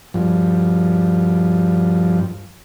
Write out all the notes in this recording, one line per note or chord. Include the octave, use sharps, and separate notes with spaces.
G2 F3